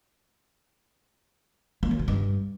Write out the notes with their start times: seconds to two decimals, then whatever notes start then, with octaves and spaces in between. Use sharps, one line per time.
1.83 A#3
1.91 F#3
1.99 C#3
2.08 G2